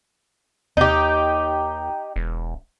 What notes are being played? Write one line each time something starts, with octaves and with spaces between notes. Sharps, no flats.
D#2 D#4 G4
E1